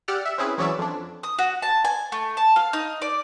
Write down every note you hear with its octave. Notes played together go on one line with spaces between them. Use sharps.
G4 D5 F#5 E6 F6
E5
C4 C#4 E4 G#4 B4
E3 F#3 C#4 C#5 D5 E5
F2 D4
D#6
F#4
A5
G#5
A3
A5
F5
D#4
D5